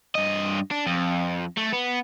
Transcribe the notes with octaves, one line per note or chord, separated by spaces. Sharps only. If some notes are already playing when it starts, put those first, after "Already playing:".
G2 D#5
D4
F2
A3
B3